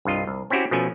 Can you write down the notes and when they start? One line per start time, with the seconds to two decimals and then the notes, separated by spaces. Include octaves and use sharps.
0.05 C2 G2 F4 D#5
0.27 C2
0.50 C4 C#4 E4 F#4 G4
0.71 B2 F3 A3 C#4 G#5